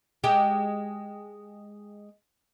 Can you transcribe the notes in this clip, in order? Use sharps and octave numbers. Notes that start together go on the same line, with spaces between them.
G#3 G4